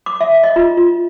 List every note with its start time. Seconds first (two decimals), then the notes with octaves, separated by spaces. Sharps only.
0.06 D6
0.21 E5
0.43 D#5
0.56 F4
0.77 F4